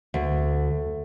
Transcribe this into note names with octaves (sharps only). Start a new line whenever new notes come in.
D2